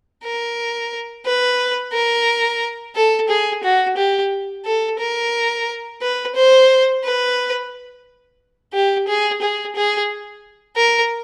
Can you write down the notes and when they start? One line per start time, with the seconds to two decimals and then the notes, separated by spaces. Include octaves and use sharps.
0.24 A#4
1.25 B4
1.93 A#4
2.96 A4
3.29 G#4
3.63 F#4
3.97 G4
4.65 A4
4.99 A#4
6.01 B4
6.35 C5
7.04 B4
8.73 G4
9.08 G#4
9.41 G#4
9.75 G#4
10.77 A#4